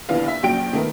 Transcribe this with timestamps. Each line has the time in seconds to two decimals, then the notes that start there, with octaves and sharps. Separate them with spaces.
0.09 A#1 D#2 D3 B3 E4 F5
0.28 E5
0.43 A#1 C#3 F#3 G5 D7
0.73 D#3 A3 B3 A#4